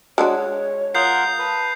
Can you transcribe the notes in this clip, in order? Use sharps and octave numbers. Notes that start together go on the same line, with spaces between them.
G#3 D4 F#4 C#5
F4 A#4 F#5 D#6 G6 C7
B4 A5